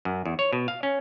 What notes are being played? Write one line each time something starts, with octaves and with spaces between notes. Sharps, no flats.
F#2
E2
C#5
B2
F5
C#4